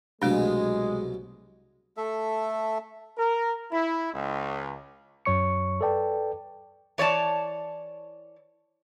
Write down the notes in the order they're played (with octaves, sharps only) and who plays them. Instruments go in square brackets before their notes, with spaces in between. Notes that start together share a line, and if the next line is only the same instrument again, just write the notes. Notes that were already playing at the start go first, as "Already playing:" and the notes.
[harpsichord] C2 B2 F#3 [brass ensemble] G#3 [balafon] A3 D4
[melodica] A3 A4 E5
[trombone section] A#4
E4
C#2
[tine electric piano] F#2 F#3 C#5 C#6 C#7
A4 B4 D5 G5 A5
[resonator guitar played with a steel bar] E3 C#5 D5 A5